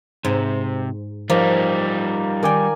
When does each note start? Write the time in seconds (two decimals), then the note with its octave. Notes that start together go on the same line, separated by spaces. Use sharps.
0.25 G#2 C3
1.30 F3 G3 A#3 D#4 A#5
2.43 D#3 A#4 D5 G5 G#5